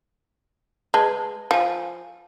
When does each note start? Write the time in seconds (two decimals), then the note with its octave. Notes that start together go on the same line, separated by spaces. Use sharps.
0.94 G#3 B4 A5
1.51 F3 F5 G#5